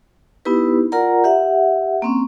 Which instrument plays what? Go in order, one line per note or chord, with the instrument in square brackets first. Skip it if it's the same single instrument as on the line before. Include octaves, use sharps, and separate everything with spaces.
[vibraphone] B3 D#4 E4 G4 B4
F4 A#4 D5 F#5 A#5
G4 E5 F#5
A#3 C4 C#4